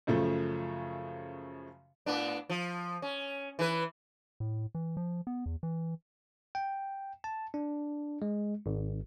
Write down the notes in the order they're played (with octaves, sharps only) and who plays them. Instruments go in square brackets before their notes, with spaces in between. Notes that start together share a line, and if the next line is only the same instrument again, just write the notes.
[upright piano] F#2 C#3 F3 A3
[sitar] A2 B3 D4
F3
C#4
E3 B4
[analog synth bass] A2
E3
F3
B3
E2
E3
[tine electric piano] G5
A5
D4
G#3
G#1